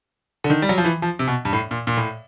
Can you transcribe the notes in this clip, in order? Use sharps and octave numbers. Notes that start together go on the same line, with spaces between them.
D3
D#3
G3
F#3
F3
E3
F3
C3
B2
G2
A2
A#2
A#2
A2